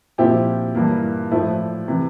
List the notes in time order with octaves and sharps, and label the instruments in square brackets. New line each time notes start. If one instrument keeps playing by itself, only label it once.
[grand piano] A#2 F3 C4 E4 G4
G2 E3 A#3
A2 F3 A3 E4
C3 E3